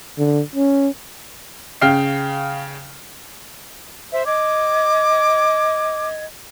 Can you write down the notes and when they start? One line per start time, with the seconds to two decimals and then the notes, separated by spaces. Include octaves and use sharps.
0.18 D3
0.56 C#4
1.82 C#3 F5 G5 F6 C7
4.12 C5 E5
4.26 D#5 D6 G#6